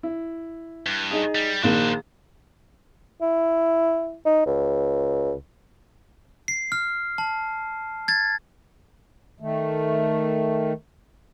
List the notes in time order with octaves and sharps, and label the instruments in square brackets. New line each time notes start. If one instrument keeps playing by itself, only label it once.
[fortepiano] E4
[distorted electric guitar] G2
[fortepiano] D#4 G#4
[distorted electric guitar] G3
[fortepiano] A#1 D#3 A#3 [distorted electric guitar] D4 C5
[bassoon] E4
D#4
C#2
[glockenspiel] C7
F6
A5
G#6 A6
[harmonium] D#3 A3